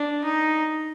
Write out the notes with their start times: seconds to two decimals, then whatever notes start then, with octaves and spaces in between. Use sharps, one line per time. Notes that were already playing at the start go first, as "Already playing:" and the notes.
Already playing: D4
0.24 D#4